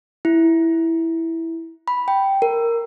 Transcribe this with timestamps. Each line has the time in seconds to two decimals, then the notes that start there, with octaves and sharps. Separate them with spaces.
0.25 E4
1.88 B5
2.08 G5
2.42 A#4